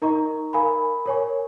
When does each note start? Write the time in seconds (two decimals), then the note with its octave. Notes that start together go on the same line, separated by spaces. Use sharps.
0.02 D#4 A#4 D#5 A#5 C#6
0.53 A#4 F5 G#5 B5
1.06 A#4 C#5 G#5 C#6